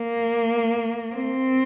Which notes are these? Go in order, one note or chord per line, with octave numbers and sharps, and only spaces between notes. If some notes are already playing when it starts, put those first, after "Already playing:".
Already playing: A#3
C4